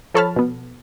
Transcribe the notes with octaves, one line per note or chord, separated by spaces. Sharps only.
F3 A4 C#5 A5 B5 F6
B2 B3